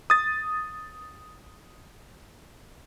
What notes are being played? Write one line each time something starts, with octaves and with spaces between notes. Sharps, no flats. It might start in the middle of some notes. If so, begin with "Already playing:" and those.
D#6 A6